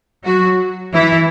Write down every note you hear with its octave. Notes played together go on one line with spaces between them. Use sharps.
F#3 F#4
E3 E4